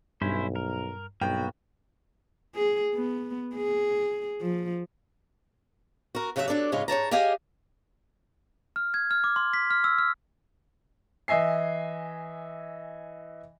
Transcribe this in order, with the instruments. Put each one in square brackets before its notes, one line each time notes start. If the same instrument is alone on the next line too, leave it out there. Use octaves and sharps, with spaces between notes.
[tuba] B1 [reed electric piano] G2 [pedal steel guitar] C#4 E4 C5
[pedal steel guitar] A#4
[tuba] B1 [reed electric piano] G2 [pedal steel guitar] A#3 B3 F#4 [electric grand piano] G5
[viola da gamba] G#4
B3
G#4
F3
[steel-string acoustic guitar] F#4 A#4
D#2 C#3 F#3 F#4 G4 E5
F#3 D4 A4 D5
G#2 C#3 G#3 C#4 E4 F4
G#2 C#5 A5 A#5
G4 G#4 D#5 F5 G5 G#5
[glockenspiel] F6
G#6
F6
D6
C6
B6
F6
E6
F6
[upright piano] E3 D#5 E5 G#5 C7